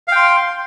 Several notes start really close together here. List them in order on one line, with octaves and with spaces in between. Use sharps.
F5 G5 C6